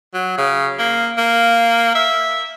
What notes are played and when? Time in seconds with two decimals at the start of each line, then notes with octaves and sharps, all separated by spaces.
0.14 F#3
0.38 C#3
0.79 A#3
1.18 A#3
1.95 E5